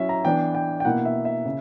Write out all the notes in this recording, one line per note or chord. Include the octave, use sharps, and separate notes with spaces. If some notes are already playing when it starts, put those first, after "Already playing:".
Already playing: F#3 C#4 E4 E5
A#5
E3 B3 D4 G5
G5
G5
B2 A#3 E4 F#5
E5
E5
C#3